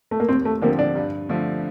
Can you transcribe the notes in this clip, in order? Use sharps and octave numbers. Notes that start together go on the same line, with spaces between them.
A3
A#3
D#2 C4
A3
D3 F3 A#3 C4 G4
D4
G2
D3 F3 A3 D4